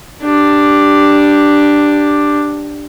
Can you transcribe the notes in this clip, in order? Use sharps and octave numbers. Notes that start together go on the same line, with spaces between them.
D4 G4